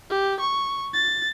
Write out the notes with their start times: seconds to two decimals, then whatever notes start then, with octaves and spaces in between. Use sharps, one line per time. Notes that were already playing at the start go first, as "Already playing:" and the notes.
0.10 G4
0.40 C#6
0.93 A6